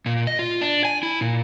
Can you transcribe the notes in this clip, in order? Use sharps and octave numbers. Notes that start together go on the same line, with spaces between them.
A#2
D#5
F4
D4
G#5
E4
A#2